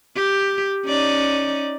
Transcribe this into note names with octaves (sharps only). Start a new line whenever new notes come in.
G4
C#4 D#4 D5